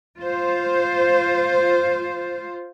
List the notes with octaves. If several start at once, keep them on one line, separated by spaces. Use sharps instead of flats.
F4 C5